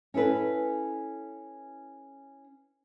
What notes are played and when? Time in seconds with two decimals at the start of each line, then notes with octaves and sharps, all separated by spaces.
0.14 C#4 E4 A4 B4